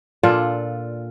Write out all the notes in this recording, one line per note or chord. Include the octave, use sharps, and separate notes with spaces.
A#2 D4 F4 A4